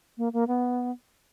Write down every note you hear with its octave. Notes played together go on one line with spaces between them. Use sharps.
A#3
A#3
B3